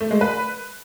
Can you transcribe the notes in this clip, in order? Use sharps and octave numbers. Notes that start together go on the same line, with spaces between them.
A3
G#3
B4